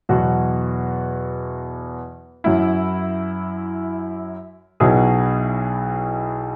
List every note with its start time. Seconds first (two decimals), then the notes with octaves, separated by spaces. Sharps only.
0.09 E2 B2 F#3 B3 F#4
2.44 F#2 F#3 E4
4.80 B1 B2 F#3 E4 G#4